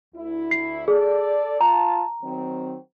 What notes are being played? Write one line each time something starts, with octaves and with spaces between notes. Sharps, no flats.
D2 E4
C7
G#4 A4 D5
F4 A5 A#5
D#3 F#3 C4